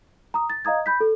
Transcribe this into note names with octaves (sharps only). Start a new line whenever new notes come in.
A#5 D#6
A6
D#5 F5 A#5 D#6 G#6
B5 G6 B6
A4